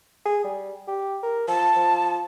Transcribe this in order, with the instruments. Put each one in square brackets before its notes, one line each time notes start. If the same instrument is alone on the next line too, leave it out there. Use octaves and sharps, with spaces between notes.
[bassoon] G#4
G3
G4
A#4
[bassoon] F3 [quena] A5
[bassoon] F3